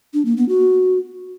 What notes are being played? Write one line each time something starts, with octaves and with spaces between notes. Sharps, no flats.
D4
A#3
B3
F#4